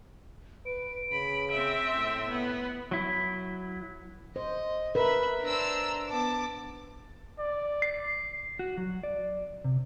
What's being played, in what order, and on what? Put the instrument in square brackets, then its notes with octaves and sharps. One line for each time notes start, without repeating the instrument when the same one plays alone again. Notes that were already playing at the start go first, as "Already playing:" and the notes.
[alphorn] B4 [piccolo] D7
[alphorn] C#3 [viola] B5
[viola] C4 E5
[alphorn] A2
[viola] B3
[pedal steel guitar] F#3 E4
[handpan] C5 [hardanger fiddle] D#5
[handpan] A#4 B4 [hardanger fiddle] E5 B5
[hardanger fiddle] D4 C5 [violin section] A#5 E6
[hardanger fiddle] B3 [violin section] A5 D6
[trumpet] D5
[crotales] C7
[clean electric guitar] F#4
F#3
D5
C3